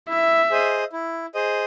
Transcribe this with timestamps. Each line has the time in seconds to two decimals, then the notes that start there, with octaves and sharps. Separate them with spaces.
0.08 E4 E5
0.50 G#4 C5 D#5
0.93 E4
1.35 G#4 C5 D#5